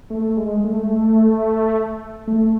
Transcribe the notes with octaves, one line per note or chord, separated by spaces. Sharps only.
A3
G#3
A3
A3